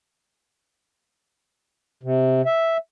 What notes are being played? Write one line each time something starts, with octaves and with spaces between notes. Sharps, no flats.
C3
E5